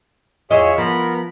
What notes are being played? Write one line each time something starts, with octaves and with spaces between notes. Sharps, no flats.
E2 F4 G#4 C#5 D#5 E5
F3 B3 A#4 B5